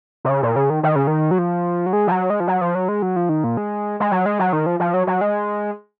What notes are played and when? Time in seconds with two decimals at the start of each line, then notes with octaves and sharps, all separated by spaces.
0.25 C3
0.29 C#3
0.43 A#2
0.56 C#3
0.70 D#3
0.83 D#3
0.96 C#3
1.07 D#3
1.31 F#3
1.39 F3
1.86 F#3
1.93 G#3
2.07 F3
2.11 F#3
2.30 G#3
2.40 F3
2.48 F#3
2.61 F3
2.75 F#3
2.88 G#3
3.02 F#3
3.16 F3
3.29 D#3
3.44 A#2
3.57 G#3
4.00 G#3
4.12 F#3
4.26 G#3
4.39 F#3
4.53 D#3
4.66 F3
4.80 F3
4.94 F#3
5.07 F#3
5.21 G#3